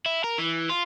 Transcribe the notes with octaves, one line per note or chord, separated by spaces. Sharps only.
E4
A#4
E3
F4